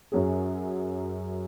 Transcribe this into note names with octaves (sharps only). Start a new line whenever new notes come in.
F#2 F#3 C#4 G#4